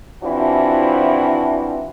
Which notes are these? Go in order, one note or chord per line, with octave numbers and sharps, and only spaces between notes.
E3 F3 C4 D4 E4 F#4